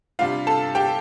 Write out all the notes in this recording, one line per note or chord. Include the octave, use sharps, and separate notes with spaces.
C3 G3 D4 F4 F5
A4 A5
G4 G5